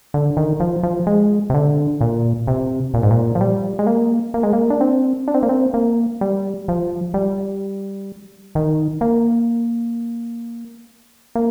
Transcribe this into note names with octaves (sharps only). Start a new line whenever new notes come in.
D3
D#3
F3
F3
G#3
C3
D3
A#2
C3
A#2
G#2
A#2
F3
G3
G#3
A#3
A#3
G#3
A#3
D4
C4
D4
C4
A#3
C4
A#3
G3
F3
G3
D#3
A#3
A#3